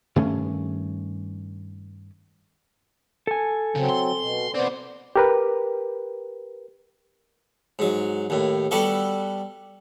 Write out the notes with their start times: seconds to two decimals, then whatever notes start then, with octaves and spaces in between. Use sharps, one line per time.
0.16 G2 D#3 A3 C#4
3.27 A4 G#5
3.76 C#3 F#3 C4
3.89 C6
4.19 B2
4.54 B1 B3 C4 C5 D5
5.16 G4 A#4 B4
7.79 G#2 F#3
8.30 D#2 A2
8.71 G3 B3 F#4 A4 D5